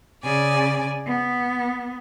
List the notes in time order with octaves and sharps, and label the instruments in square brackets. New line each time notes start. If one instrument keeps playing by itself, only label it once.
[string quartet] C#3 D5 G#5
B3